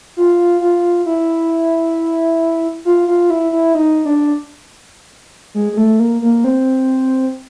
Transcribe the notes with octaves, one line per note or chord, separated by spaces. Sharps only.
F4
F4
E4
F4
F4
E4
E4
D#4
D4
G#3
G#3
A3
A#3
A#3
C4